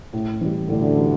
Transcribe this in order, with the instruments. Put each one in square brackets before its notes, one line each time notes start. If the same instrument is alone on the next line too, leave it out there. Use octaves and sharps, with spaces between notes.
[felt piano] A2
E3 G3
[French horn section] D2 D3 [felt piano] A2
[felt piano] E3 G3